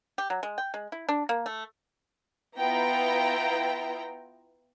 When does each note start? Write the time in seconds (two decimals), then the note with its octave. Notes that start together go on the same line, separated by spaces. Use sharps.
0.18 G4
0.30 F#3
0.43 G#3
0.58 G5
0.74 G#3
0.92 E4
1.09 D4
1.29 A#3
1.46 A3
2.58 B3 E4 F4 G5 A#5